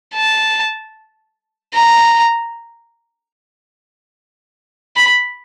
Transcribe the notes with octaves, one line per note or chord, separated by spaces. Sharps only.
A5
A#5
B5